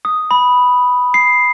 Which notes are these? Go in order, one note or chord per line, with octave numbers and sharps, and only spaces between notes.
D#6
B5
C7